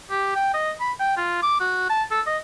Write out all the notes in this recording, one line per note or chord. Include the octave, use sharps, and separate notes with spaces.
G4
G5
D#5
B5
G5
F4
D6
F#4
A5
A4
D#5